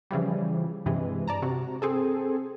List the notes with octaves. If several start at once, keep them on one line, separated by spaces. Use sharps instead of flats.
C#3 E3 F3 G3
G2 C3 E3 G#3
D5 A5 A#5
C3 F#4
C4 G#4 A4